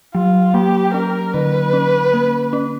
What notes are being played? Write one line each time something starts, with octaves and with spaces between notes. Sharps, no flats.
F#3 F4
A#3 G4
C#4 A#4
D3 B4
C#4
A#3
C#4